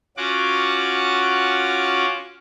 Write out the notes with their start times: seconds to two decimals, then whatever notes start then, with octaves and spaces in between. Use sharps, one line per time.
0.17 C#4 F4 F#4 F#5 D6